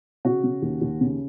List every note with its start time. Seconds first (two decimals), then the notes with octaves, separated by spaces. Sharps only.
0.25 C#3 F#4
0.44 C#3
0.62 D#2
0.81 D#2
1.01 C#3